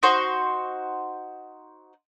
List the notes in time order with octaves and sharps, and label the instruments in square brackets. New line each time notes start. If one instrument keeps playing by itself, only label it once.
[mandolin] D#4 F#4 C5 C#6